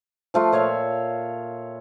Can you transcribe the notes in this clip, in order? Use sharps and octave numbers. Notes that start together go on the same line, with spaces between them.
F3 A3 F4
A#2 C#5 E5 F5